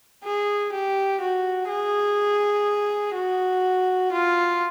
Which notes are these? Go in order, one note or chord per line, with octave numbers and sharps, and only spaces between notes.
G#4
G4
F#4
G#4
F#4
F4